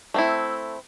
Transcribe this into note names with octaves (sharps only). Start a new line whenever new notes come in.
A3 C4 E4